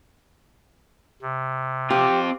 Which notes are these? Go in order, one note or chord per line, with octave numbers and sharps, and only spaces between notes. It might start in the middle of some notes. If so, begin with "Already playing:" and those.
C3
C4 F4 G4